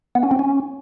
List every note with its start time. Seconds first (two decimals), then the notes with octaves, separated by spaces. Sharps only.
0.15 B3
0.23 C#4
0.31 C4
0.39 C#4